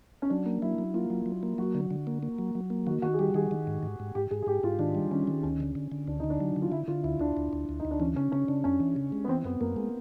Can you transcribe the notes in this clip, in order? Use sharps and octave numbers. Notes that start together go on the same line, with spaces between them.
C#4
F#3 D4
A#3
F#3 E4
F#3
A#3 F4
F#3
F#3
A#3
F#3 F#4
D3
D3
A#3
A#3
F#3
F#3
A#3
D#3 F#4
D#3 F#4
G#4
G3 G4
D#3 G#4
D#3
G#2
G#2
G#2
G#2 G4
G#2 G#4
G#4
G#2 G4
G#2 F4
D#3 D4
G3
D#3 C#4
D#3
D2 C#4
D3
D3
D3
D2 D4
D3 D#4
D4
F#3
D3
F4
D3 E4
D3 F4
D2 E4
D2 D4
D2
D2
D2
D#4
D2
D4
E3 C#4
C#3 C#4
C#3 C#4
C#3 D4
F#2 C#4
E3
C#3
G#3
B3
E3 C4
F#2 B3
F#2 A#3
G#3 B3